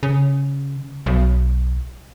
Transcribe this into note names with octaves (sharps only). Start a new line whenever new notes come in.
C#3
B1